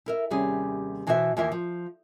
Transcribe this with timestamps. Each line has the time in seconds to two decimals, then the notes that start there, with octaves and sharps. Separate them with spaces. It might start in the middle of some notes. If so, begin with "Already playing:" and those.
0.06 E4 A#4 E5
0.30 D#2 C3 G3 C#4 G#4
1.07 B2 E3 F#4 C5 C#5 E5
1.37 D#2 E3 F4 A#4 E5
1.52 F3